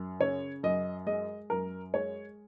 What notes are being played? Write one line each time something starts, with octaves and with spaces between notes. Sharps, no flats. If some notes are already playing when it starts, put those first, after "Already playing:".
Already playing: F#2
C#3 C#5
F#2 D#5
G#3 D#5
F#2 A#4
G#3 C#5